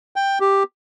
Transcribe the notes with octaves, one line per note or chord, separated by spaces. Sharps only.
G5
G4